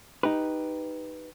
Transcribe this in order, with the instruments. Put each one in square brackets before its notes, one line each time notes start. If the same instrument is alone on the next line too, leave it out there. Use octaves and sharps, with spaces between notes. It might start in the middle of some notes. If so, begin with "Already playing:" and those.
[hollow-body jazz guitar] D#4 G4 B4